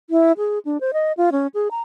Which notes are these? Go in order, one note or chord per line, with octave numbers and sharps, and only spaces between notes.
E4
G#4
D4
C5
D#5
F4
C#4
G#4
A#5